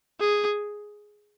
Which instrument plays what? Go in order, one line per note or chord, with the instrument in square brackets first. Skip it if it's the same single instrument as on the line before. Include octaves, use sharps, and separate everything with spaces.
[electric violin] G#4